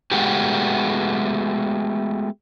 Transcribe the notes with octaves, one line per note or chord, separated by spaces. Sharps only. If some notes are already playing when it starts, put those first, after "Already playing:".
G#3 A3 B3 F#4 G4